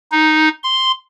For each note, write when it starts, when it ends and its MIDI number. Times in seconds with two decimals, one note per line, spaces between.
0.12 0.49 63
0.63 0.92 84